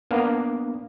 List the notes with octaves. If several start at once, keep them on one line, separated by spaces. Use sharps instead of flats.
A#3 B3 D4 F5